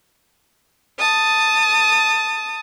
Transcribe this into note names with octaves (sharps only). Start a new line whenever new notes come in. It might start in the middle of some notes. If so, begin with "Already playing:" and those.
A5 D#6